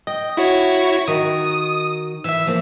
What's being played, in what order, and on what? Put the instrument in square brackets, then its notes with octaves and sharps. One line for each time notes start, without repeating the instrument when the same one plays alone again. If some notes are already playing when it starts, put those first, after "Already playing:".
[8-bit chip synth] D#5 [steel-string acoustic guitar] G5
[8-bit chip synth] E4 F#4 C#5
[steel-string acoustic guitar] D#3 F#4 A#4 [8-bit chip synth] D#6
[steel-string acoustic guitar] E3 [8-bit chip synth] E5 E6
[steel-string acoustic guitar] F3 A#3